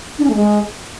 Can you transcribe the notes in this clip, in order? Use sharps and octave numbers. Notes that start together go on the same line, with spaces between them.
D4
C#4
A3
G#3